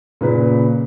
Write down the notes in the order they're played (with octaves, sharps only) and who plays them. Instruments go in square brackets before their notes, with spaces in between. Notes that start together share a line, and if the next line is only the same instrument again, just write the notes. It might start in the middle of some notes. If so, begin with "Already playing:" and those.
[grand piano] A#2 C#3 B4